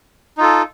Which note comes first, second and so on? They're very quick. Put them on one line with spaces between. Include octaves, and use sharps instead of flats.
D#4 F4 A4